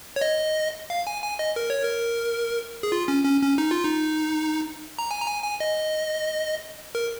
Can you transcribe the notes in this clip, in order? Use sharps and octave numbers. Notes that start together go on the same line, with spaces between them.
C#5
D#5
F5
G#5
G#5
D#5
A#4
C#5
A#4
G#4
F4
C#4
C#4
C#4
D#4
F4
D#4
A#5
G#5
A#5
G#5
G#5
D#5
A#4